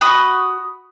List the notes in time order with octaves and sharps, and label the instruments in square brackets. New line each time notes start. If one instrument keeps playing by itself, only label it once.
[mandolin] F#4 B5 D#6